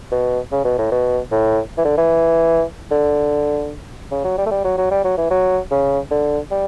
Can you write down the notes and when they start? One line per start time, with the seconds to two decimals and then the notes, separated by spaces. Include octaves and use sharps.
0.11 B2
0.52 C#3
0.64 B2
0.78 A2
0.92 B2
1.32 A2
1.78 E3
1.85 D3
1.97 E3
2.91 D3
4.11 C#3
4.24 F#3
4.38 G3
4.46 A3
4.51 G3
4.64 F#3
4.78 F#3
4.91 G3
5.04 F#3
5.17 E3
5.31 F#3
5.71 C#3
6.11 D3
6.51 G3